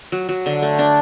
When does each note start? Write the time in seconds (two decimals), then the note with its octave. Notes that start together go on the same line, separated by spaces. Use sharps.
0.12 F#3
0.29 F#3
0.46 D3
0.62 A3
0.79 D4